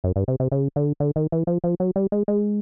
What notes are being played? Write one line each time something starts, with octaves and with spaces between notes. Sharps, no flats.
F#2
G2
C3
C3
C#3
D3
D3
D#3
E3
F3
F3
F#3
G3
G#3
G#3